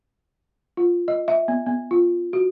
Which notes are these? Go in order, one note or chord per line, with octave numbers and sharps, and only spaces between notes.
F4
D#5
E5
B3
B3
F4
F#4